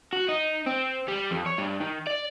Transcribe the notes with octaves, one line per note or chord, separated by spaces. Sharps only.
F#4
D#4
C4
G3
F2
C#5
G2
D#3
D5